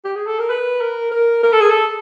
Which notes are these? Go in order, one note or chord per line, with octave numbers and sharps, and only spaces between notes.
G4
G#4
A4
A#4
B4
A#4
A#4
A#4
A4
G#4
A4